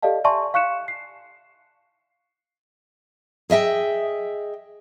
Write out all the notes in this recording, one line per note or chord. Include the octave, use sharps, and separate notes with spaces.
G4 A4 D5 D#5 F5 A5
D5 E5 G#5 A5 C6 C#6
F5 C#6 F#6 C#7 E7
C7
G#4 D#5 E5 G5